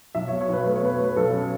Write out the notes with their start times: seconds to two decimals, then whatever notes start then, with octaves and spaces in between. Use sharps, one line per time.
0.15 B1 E5
0.28 C#5
0.32 B2
0.41 C#5
0.49 B1 B4
0.66 A3 B4
0.76 C#5
0.82 B2 B4
0.94 C#5
0.99 A3 B4
1.16 B1 A4
1.34 C#4